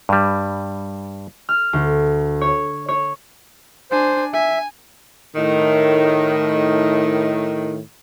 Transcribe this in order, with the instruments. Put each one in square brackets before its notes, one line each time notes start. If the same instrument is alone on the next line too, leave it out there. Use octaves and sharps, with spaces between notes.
[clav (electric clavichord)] G2 G3
[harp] F6
D2
C#5
C#5
[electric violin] D4 G#5 [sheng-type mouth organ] C5
[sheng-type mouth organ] E5 [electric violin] G#5
[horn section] A2 D#3